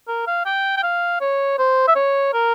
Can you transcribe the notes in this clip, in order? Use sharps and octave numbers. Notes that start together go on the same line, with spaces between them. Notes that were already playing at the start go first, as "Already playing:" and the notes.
A#4
F5
G5
G5
F5
C#5
C5
E5
C#5
A#4